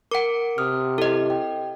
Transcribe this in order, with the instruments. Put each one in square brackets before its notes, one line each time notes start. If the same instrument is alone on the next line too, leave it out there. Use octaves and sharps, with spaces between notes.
[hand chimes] A#4 C#7 D7 [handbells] F#5 D6
[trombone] C3 [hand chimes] D#6 F6
[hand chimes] E4 G4 [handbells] A4 D#5
[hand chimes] G5